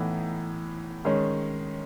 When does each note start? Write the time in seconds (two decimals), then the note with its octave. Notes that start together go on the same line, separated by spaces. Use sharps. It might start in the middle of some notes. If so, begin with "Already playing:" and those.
Already playing: A2 E3 B3 D#4
1.05 D#3 G#3 C#4